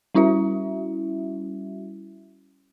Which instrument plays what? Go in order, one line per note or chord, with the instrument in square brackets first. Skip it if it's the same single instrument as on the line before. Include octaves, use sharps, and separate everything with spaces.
[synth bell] G3 C#4 E4 F#4 E5